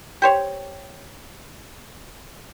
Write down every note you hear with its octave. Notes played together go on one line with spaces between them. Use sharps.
G4 C5 C#5